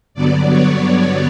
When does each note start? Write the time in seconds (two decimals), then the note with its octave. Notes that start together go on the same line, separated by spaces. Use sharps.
0.14 G2 D3 F#3 B3 D5
0.49 C#5